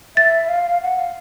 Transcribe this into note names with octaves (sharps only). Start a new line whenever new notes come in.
E5 A6
F5
F#5
F5